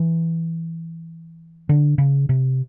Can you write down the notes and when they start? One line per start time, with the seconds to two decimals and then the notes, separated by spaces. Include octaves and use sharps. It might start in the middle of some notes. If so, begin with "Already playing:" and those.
Already playing: E3
1.69 D3
1.98 C#3
2.29 C3